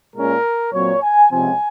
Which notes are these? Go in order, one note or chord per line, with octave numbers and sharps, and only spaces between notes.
A#2 G#3 C#4 A#4
A#2 F#3 C4 C#5
G#5
C#2 C3 F3 C4 G#5